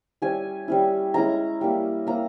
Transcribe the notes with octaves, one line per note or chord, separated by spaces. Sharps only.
G3 C#4 E4 G#5
G3 C#4 E4
G#3 C#4 E4 A#5
G3 A#3 E4
A#3 E4 A#5